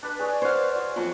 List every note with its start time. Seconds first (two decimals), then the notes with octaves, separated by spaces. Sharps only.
0.03 D4 B4
0.19 G#4 C#5 D5
0.42 C5 C#5 F5 F#5
0.75 F#4
0.96 F2 F#3 C#6